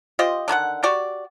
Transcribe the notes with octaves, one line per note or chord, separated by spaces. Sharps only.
F4 G4 C5 D#5
D3 D#3 E4 F#5
F#4 G4 D5